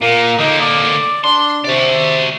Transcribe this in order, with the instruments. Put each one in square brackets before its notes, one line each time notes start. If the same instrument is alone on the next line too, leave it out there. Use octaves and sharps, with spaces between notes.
[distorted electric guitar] A#2 [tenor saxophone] A#3
[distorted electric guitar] D3 A#3 [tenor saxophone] D#4
[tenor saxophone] D5
[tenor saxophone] D4 [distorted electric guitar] C6
[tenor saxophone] C3 [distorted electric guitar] F#4 D5